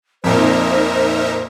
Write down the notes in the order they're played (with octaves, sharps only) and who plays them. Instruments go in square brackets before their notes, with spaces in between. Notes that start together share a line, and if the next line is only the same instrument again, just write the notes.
[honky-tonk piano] F2 A#2 [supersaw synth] D#4 A#4 E5 [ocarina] C5